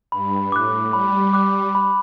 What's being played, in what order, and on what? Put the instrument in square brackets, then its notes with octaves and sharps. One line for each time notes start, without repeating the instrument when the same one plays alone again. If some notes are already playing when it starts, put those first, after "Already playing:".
[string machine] G2 [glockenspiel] B5
[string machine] A2 [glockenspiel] D6 F#6
[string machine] G3 [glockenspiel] B5
[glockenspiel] D6 F#6
B5